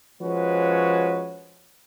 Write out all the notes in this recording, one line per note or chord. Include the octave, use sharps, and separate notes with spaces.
F3 G#3 C#4 F#4 B4 C#5